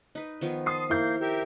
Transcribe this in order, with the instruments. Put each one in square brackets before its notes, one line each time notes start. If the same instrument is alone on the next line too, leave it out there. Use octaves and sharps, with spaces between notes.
[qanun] D#4 B4
D#3 F3 B3
[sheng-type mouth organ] A5 C6 [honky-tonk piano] D#6 C7
[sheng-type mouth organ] A#3 F5 [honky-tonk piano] E4 G6
[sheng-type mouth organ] G4 A#4 E5